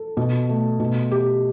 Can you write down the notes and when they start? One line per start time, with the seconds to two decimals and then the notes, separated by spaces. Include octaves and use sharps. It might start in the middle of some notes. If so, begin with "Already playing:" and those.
Already playing: A4
0.17 B2
0.49 A3
0.80 B2
1.11 G4